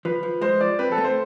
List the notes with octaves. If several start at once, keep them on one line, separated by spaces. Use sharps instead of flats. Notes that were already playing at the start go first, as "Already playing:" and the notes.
F3 B4
F3
G#3 C5
F3 D5
C4 B4
A4
A3
C5